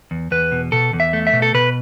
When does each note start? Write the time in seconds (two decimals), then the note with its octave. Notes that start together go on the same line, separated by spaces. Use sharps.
0.11 E2
0.31 E2 B4
0.52 B2
0.72 B2 A4
0.93 E2
1.00 E5
1.13 A3
1.27 E5
1.33 B2
1.42 A4
1.54 B2 B4